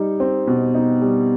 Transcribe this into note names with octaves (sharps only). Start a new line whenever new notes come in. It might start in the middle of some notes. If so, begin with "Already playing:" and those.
Already playing: G3 D#4
C4
B2
D#4
G3